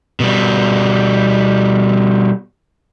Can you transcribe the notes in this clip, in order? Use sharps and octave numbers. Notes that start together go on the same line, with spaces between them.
B2 G3